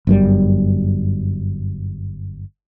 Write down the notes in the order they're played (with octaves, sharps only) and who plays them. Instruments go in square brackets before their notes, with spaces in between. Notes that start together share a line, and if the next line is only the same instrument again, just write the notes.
[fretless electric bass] G1 F#2 G3